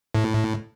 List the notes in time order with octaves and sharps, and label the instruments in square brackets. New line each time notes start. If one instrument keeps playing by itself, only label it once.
[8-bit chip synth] A2